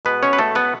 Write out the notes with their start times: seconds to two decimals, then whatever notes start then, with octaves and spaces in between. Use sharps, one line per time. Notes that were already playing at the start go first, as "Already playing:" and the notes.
0.05 B2 G#3 B3 B4
0.23 C#4 C#5
0.33 B4
0.39 A3 A4
0.55 B3 B4